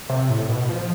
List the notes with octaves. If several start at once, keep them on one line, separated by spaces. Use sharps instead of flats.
C3
A2
B2
F3